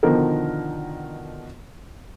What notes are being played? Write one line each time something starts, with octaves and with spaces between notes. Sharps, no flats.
B2 D3 D#3 F3 A#4